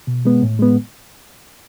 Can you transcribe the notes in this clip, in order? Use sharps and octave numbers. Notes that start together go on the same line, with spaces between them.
B2
G#3 B3
A2
G#3 B3